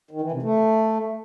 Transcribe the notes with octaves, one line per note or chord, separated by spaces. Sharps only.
D#3
E3
C3
A3